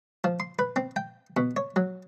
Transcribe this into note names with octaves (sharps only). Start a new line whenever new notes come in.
F3
C6
B4
C4
G5
B2
C#5
F#3